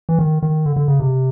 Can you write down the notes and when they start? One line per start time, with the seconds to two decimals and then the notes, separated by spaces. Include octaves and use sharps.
0.09 E3
0.19 D#3
0.43 D#3
0.66 D3
0.76 D3
0.88 C#3
1.00 C3